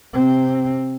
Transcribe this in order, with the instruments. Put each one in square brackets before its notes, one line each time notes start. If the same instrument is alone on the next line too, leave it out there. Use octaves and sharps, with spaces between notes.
[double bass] C3 C4